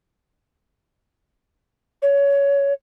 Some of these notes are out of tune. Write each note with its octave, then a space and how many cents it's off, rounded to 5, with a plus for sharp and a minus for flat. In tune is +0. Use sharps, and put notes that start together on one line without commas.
C#5 +20